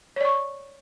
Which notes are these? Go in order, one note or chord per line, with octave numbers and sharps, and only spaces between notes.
C#5 D5 C#6